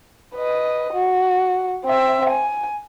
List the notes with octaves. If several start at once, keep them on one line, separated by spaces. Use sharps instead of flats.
B4 D#5
F#4
C4 E5
G#5